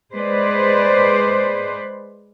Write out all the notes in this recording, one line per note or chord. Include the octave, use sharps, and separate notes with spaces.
G#3 B4 C5 D5